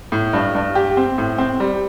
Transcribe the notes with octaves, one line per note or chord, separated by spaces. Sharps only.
A2
G2
G2
G4
C4
A2
C4
G3